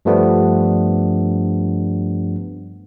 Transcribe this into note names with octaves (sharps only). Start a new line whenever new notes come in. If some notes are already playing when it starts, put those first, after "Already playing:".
G2 F3 G3 A3 B3 D4